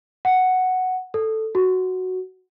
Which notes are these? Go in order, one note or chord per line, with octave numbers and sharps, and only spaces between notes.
F#5
A4
F#4